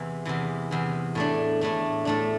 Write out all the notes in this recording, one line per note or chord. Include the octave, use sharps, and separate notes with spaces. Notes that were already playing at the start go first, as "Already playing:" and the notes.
Already playing: E2 C3 E3
E2 C3 E3
E2 C3 E3
A2 A3 D4
A2 A3 D4
A2 A3 D4